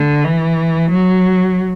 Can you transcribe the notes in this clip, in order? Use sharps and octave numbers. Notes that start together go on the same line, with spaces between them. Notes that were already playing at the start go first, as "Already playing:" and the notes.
Already playing: D3
E3
F#3